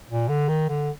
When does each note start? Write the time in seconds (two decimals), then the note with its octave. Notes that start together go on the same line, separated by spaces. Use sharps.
0.10 A#2
0.29 D3
0.48 D#3
0.69 D3